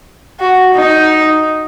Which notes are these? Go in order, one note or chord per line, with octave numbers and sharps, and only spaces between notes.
F#4
D#4